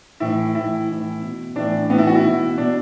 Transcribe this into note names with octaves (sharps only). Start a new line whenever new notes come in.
A2 E3 E4
A2 E3 E4
A2 E3
B2
A2 E3 D4
A2 E3 B3
E4
F#4
E4
B2
B2 D4